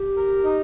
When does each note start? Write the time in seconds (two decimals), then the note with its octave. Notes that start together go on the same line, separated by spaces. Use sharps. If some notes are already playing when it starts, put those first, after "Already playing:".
Already playing: G4
0.17 A#4
0.44 D#4